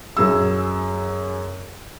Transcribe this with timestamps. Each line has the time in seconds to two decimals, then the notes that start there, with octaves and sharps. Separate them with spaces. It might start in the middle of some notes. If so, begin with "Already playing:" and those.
0.17 F#2 G#4 E6